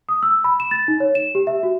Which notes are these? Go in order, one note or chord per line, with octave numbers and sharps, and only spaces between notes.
D#6
E6
B5
E7
A6
D#4
C#5
E7
G4
E5
F#4